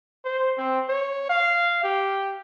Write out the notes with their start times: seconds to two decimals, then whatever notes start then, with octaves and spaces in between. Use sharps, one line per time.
0.25 C5
0.58 C4
0.89 C#5
1.29 F5
1.83 G4